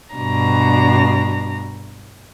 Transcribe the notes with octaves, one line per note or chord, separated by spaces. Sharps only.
G2 B2 D4 A#5